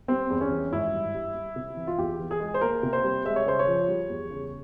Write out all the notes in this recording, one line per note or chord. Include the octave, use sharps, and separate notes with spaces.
G3 C4
E2
C#4
E3
G#1 E4
G2
G3
G3
C3
E3
F4
E2 G4
E3
G#4
G#3
C5
A#3 A#4
C3
C5
G3
G#3 E5
C#5
C#3 C5
C#5
F3
G3
E2
C#3